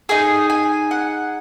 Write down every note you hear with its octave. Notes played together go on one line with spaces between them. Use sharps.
D#4 G#4 G#5
G#5
F#5